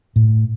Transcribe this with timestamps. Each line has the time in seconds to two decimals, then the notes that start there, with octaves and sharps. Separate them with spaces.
0.16 A2